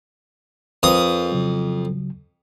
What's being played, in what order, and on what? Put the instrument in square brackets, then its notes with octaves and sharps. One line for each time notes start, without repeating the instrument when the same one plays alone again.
[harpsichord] F2 D#6 [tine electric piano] A#4 B4 F5
[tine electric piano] C#3 F#3